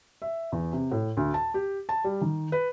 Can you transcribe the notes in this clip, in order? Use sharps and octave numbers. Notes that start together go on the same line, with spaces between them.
E5
E2
C3
A2
D2
A5
G4
A5
G3
D#3
B4